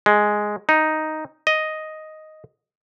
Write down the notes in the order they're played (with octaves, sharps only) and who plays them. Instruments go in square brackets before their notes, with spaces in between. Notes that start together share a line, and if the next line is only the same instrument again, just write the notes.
[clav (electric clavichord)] G#3
D#4
D#5